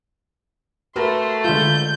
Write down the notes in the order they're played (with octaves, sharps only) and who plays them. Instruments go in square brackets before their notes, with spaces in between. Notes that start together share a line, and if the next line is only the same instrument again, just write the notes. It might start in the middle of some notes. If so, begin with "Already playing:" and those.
[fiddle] A3 [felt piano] F#4 A#4 B4 [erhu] C6
[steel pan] D3 G#3 F4 [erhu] G6